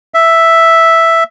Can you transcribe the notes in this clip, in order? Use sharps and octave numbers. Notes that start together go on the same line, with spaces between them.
E5